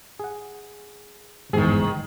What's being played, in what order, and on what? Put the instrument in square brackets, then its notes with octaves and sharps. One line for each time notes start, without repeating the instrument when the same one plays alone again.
[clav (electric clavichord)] G#4 F#5
[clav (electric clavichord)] G1 E2 G#2 [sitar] D#3 G#4